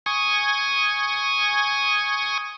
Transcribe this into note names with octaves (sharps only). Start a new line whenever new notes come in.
G#5 C#6 D#6